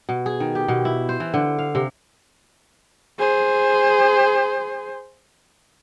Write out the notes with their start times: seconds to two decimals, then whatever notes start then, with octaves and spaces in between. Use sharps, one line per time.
0.09 B2
0.26 G#4
0.40 D#3
0.55 G4
0.68 B2
0.85 E4
1.09 C5
1.20 E3
1.34 D3
1.59 F5
1.75 C3
3.19 G#4 C5